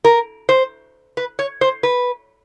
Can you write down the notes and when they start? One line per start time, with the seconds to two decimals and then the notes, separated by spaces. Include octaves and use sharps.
0.04 A#4
0.49 C5
1.17 B4
1.39 C#5
1.61 C5
1.83 B4